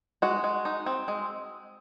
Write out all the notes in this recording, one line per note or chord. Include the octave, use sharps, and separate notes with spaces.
G#3 F#4
G#3
D#4
C4
G#3